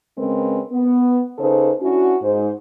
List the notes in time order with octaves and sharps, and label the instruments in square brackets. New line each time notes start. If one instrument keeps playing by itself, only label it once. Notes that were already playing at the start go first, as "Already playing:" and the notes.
[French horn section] C#3 G#3 C4 C#4 A#4 B4
B3
C#3 D#4 A4 B4 C5
C#4 D4 E4 F#4
G#2 C5